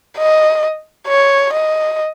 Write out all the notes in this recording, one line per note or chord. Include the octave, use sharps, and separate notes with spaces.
D#5
C#5
D#5